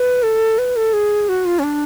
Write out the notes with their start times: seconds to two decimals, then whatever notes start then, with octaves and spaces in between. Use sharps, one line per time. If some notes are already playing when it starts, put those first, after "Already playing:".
Already playing: B4
0.23 A4
0.58 B4
0.76 A4
0.93 G#4
1.29 F#4
1.45 F4
1.59 C#4
1.63 D4